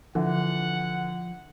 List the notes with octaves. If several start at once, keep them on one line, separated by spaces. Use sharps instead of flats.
D3 E3 F3 F#5